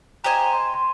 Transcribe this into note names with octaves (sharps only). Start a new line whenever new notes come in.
G4 C5 D#5 G#5 A#5
C6
C6